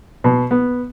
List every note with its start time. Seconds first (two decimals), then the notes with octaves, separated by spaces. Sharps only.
0.24 B2
0.51 B3